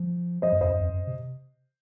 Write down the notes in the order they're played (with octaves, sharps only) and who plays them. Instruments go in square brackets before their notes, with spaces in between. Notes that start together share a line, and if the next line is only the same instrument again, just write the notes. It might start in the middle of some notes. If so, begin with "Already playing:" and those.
Already playing: [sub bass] F3
[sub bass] F3 [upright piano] C5 D#5
[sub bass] F#2
[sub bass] F2 [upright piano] C5 D#5
[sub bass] F#2
F2
F#2
C3